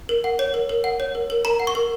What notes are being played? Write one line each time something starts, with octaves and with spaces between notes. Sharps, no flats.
A#4
F#5
C#5
A#4
A#4
F#5
C#5
A#4
A#4
A#4 A#5
F#5
C#6
A#4